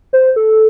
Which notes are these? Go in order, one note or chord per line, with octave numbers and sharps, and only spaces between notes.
C5
A4